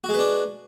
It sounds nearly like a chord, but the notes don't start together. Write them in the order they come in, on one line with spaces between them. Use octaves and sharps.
F#4 G#3 B4 D4